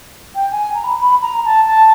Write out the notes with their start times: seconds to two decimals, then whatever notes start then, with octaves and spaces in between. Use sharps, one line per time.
0.34 G5
0.51 G#5
0.74 A#5
0.83 B5
1.00 B5
1.22 A#5
1.45 A5
1.66 A5